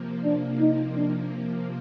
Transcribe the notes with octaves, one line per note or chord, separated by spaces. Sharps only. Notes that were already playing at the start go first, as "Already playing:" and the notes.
Already playing: C3 F3 A#3
D4
D#4
D4